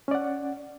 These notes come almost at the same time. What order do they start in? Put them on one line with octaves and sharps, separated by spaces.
C#4 D5 F#5